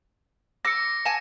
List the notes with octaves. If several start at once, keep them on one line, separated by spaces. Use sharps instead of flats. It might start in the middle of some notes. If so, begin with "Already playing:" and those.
D6 E6 A#6 C#7
G#5 A5